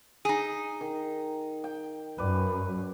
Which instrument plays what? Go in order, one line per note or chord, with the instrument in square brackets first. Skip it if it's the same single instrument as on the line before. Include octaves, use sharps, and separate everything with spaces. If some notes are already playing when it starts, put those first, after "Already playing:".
[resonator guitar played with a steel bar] D#4 G#4
[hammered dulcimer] D#3
G5
[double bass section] F#2 [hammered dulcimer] B4 D5